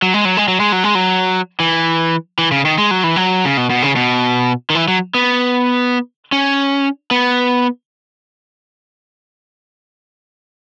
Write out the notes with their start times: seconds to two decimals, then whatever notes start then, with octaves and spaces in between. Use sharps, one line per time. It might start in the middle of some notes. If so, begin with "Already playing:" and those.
0.02 F#3
0.14 G#3
0.25 F#3
0.37 G#3
0.48 F#3
0.60 G#3
0.72 F#3
0.84 G#3
0.95 F#3
1.60 E3
2.38 E3
2.52 C#3
2.65 D#3
2.78 G#3
2.91 F#3
3.04 E3
3.16 F#3
3.45 C#3
3.57 B2
3.70 B2
3.82 C#3
3.96 B2
4.70 D#3
4.75 E3
4.88 F#3
5.14 B3
6.32 C#4
7.11 B3